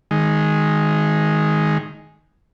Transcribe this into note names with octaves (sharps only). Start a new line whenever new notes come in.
D#3 G#3